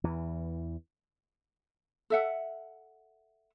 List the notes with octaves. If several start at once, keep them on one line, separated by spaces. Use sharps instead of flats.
E2 E3
A4 E5 F#5